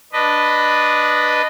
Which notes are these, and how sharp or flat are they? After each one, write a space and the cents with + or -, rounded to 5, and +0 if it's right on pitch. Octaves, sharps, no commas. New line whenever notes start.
D4 +0 B4 +0 D#5 -15